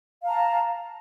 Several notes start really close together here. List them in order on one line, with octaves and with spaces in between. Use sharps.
F5 A#5 A5